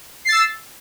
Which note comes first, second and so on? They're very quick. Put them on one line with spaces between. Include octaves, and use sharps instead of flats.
C7 A6 E6